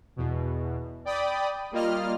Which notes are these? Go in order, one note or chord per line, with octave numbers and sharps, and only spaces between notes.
E2 B2
D5 G5 B5 D#6
G3 A#3 F4 D#5 F6